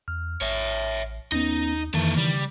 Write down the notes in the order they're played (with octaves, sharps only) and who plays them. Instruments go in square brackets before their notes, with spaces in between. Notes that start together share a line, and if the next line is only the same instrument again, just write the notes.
[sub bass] E2 [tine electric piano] F6
[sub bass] A1 [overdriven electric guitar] C#5 E5
[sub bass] D#2 [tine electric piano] B3 C#4 A#6 [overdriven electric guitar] D#4
[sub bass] F2 [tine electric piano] D#3 E3 [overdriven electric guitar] A#3 A4
[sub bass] C#3 [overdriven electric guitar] G3